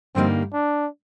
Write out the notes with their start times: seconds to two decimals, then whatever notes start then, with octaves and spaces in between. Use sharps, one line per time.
0.15 G2 D3 G3 A#3 C4 D#4
0.53 D4